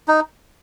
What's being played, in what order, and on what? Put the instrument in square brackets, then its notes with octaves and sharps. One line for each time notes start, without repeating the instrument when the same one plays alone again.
[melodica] D#4